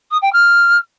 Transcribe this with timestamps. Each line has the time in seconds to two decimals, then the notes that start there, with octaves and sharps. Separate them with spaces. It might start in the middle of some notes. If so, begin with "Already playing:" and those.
0.11 D#6
0.22 G5
0.33 F6